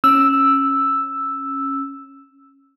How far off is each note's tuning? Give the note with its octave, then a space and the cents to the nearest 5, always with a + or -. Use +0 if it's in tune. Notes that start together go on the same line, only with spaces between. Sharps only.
C#4 -15 E6 +0